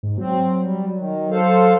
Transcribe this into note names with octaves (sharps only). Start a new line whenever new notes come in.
G#2
F#3 C4
G3
D#3
A4 C5 F5